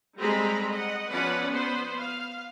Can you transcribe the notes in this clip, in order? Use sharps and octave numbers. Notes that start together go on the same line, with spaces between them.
G3 G#3 C4 A4 A#5 B5
D#5 F#5
F3 B3 C#4 B4 D5 F#5
B3 C5
F5